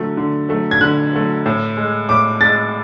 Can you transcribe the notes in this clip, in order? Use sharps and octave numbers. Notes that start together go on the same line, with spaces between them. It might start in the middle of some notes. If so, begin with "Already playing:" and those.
Already playing: D3 F#3 A3
D3
F#3 A3
G#6
D3 F#6
F#3 A3
A2
G#3
A2 D6
G#3 A6